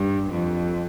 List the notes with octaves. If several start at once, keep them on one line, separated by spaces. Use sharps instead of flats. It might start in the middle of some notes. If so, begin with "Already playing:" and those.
Already playing: G2
F2